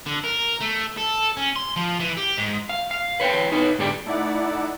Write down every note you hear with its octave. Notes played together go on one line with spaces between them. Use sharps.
D3
A#4
A3
A4
C#4
C6
F3
E3
G4
G#2
F5
F5
B4 C#5 F#5 G5
D#4 B4 C#5
G#2 D3 G4 D5 G5
A3 D#4 E4 D5 E5 F#5